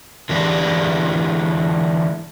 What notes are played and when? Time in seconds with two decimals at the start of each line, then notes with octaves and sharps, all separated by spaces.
0.29 D3 E3 G#3 D4 E4 G4